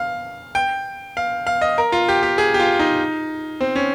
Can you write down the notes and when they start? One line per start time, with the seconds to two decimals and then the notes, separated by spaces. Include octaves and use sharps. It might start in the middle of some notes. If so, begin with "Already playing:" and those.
Already playing: F5
0.55 G5
1.17 F5
1.47 F5
1.61 D#5
1.78 A#4
1.92 F4
2.09 G4
2.23 G4
2.38 G#4
2.54 G4
2.60 F4
2.79 D#4
3.61 C4
3.76 C#4